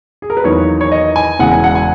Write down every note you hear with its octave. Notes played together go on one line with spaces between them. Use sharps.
G#4
A#4
B4
E2 D#3 F#3 A#3 D#4 C#5
C#5
D#5
G#5
E1 E2 C#3 G#3 F#5
G#5
F#5
G#5